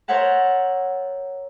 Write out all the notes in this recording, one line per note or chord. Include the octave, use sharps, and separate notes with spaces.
A#4 C5 C#5 E5 F#5 A5